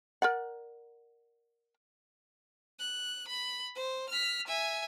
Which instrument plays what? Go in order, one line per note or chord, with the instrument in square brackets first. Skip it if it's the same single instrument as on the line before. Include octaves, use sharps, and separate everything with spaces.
[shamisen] A#4 D5 F#5
[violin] F#6
B5
C5
F6 B6
E5 G#5